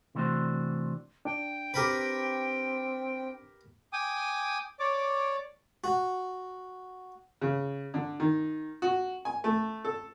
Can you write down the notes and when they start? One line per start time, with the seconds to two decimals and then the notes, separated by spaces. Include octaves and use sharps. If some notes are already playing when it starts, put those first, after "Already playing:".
0.15 C3 E3 A3 D4 F#4 C5
1.25 D4 G5
1.74 C4 G4 A#4 B4
3.93 G5 G#5 D6 D#6
4.79 C#5 D5 D6
5.84 F#4
7.41 C#3
7.94 D3
8.20 D#3
8.82 F#4
9.25 G#5
9.44 A3
9.85 A4